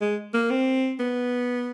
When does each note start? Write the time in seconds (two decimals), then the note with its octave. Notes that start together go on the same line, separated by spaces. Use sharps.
0.01 G#3
0.34 A#3
0.50 C4
1.00 B3